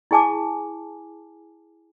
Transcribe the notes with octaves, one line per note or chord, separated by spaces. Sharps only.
E4 G#4 G#5 A5 D6